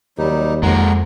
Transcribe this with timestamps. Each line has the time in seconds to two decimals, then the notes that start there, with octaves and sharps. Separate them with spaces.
0.18 D#2 F#3 G3 D#4
0.63 F2 G#3 A#3 F#5 A#5